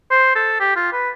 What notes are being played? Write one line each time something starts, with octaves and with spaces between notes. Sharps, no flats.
C5
A4
G4
F4
B4